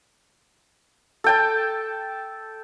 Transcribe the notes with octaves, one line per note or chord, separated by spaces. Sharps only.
A4 G5 A5